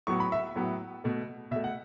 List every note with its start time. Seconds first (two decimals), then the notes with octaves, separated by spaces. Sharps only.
0.07 A2 F#3 B3 C#6
0.20 B5
0.32 E5
0.56 A2 F#3 B3
1.04 B2 A3
1.51 B2 E5
1.56 A3
1.64 F#5